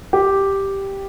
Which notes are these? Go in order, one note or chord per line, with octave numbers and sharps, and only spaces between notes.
G4